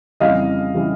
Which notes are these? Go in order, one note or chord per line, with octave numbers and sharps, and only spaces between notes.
F2 C#3 E3 G3 D#5 F5
C#3 E3 G3